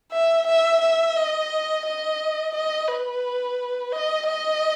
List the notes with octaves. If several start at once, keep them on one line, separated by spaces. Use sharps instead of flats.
E5
E5
E5
D#5
D#5
D#5
B4
D#5
D#5